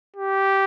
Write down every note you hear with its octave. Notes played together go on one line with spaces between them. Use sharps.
G4